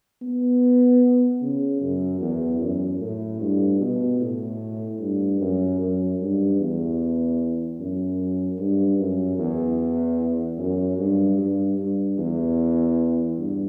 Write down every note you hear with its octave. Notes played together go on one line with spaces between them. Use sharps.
B3
C#3
F#2
E2
F#2
A2
G2
B2
A2
G2
F#2
F#2
G2
E2
F#2
G2
F#2
E2
F#2
G2
G2
G2
E2
G2